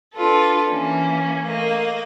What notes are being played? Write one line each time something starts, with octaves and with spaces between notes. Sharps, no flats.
D4 F4 A4 B4
E3 A#3 C#4
A3 A#3 D#5